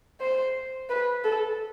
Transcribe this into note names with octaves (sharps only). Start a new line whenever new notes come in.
C5
B4
A4